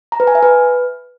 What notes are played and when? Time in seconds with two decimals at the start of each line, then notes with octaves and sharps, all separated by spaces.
0.12 A#5
0.20 B4
0.27 G#5
0.35 E5
0.43 B4